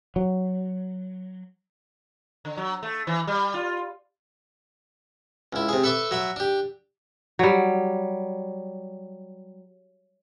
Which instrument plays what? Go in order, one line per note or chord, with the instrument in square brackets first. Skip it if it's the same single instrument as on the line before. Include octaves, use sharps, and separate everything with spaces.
[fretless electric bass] F#3
[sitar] D3
F#3
A3
E3
G3
F4
[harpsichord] C#2 E4
C3 G#4
A4 B4 E5 A5 D6
F#3 E5 B5
D4 G4
[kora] F#3 G3